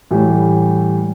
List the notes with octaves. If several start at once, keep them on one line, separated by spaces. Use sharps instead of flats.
A2 E3 G3